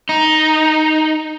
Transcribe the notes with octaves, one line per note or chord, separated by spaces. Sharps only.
D#4